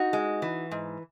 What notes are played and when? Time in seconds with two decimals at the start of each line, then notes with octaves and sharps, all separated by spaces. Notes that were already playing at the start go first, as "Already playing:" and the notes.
Already playing: D#4 F#4
0.13 G#3
0.42 E3
0.71 G#2